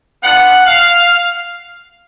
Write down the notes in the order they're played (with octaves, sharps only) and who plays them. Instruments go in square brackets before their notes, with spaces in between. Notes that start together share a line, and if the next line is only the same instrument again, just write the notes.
[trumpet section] B3 D4 F4 F#5
F5